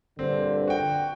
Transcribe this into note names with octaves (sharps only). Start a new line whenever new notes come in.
A#1 G2 D3 C4
F#4 G5